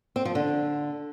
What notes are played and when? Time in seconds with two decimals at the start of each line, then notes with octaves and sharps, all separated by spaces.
0.16 C4
0.25 F3
0.35 D3